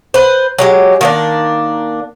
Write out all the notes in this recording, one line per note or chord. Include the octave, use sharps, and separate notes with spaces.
B4 C5
F#3 G#3 G4
D#3 A#3 D4